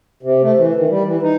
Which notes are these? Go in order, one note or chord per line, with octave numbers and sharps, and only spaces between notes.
C3
A3
E3
D#3
G3
E3
D#4